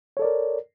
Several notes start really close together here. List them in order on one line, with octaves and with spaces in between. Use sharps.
C#5 A4 D5 A#4